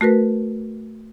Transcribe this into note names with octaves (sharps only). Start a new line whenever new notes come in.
A3 F#4 A#4 B4